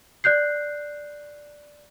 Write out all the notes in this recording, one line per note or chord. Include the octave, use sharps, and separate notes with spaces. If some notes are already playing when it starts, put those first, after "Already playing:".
D5 F#6 G6 C7